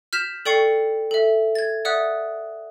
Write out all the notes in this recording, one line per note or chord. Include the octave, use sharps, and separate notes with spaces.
F6 G6 B6 E7 F7
A4 D5 G5 C#6 C7 C#7
A4 E5
G#6 A6
D5 E5 F#5 D#6 F#6